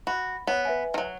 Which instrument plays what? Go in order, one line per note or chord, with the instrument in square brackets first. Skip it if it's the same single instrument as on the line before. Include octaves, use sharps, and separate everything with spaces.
[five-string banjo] F#4 [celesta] B5
[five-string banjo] B3 [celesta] C#5
[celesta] B4 E5 G#5
[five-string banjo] D#3 F#3